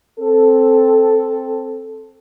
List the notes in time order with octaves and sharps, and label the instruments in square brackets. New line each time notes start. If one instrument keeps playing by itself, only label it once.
[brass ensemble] C4 A4